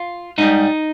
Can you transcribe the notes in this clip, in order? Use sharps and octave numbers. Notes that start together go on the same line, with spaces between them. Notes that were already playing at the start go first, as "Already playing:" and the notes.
Already playing: F4
G#2 G3 D#4